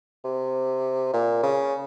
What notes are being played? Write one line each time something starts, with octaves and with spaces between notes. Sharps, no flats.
C3
A#2
C#3